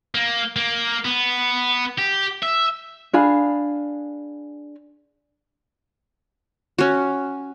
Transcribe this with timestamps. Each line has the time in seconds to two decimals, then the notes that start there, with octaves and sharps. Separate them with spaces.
0.14 A#3
0.56 A#3
1.05 B3
1.98 G4
2.43 E5
3.13 D4 G#4 F5 B5
6.78 C#4 F#4